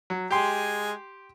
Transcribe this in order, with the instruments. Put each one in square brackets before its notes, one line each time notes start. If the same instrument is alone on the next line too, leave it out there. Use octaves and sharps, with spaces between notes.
[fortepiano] F#3
[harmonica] G#3 G#5 [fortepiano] G4 C6